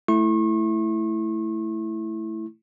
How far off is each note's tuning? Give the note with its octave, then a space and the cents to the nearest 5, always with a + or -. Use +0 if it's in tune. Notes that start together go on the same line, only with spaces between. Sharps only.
A3 +0 E4 +0 C#6 -40